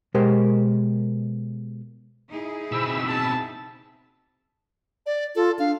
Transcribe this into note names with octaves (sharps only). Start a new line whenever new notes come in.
B2 G#3 G4 A#4 C5
D#4 E4 G#4
B2 C4 B5 E6
A5
D5
F4 A4
D4 F5